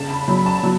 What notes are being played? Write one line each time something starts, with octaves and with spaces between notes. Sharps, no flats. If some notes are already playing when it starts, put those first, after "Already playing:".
Already playing: C#3 A5
B5
F#3 B5
A5
F#3